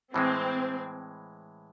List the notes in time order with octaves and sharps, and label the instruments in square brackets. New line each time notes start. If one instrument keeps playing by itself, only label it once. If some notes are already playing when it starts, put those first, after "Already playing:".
[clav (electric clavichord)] A2 E3 G#3 [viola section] C4